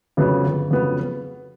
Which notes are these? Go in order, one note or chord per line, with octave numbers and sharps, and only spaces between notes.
F2 C#3 F#3 B3
G1
F2 C#3 F#3 B3